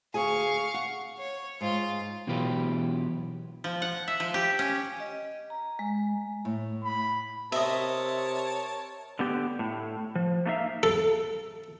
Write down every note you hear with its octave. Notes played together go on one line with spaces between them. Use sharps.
D2 G#4 F5 G#5 C#6
F#5
C#5
G#2 F4 F5
B2 E3 F#3 F4 G4 B4
F3
F#5
E5
F3
G4
C#4
D#5
A#5
G#3
A2
B5
C3 A#4 C#5 D#5 E5 A5
D3 B3 G4
A2
F3
A3 A#3 D#4 F4 E5 F5
A4